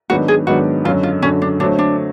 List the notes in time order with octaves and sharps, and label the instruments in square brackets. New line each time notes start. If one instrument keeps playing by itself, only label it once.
[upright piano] G#2 D#3 F#3 B3 D4 [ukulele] F#4
[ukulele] G#4
[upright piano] G#2 D#3 F#3 B3 D4 [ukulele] F#4
[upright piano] F#2 D3 F#3 [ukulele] F4
[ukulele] F4
[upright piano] F#2 D3 F#3 [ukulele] C#4
[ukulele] D4
[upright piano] D3 F#3 A3 C4 [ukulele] D4
[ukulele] D4